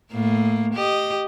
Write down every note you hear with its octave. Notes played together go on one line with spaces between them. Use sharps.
A2 A#3
G4 D#5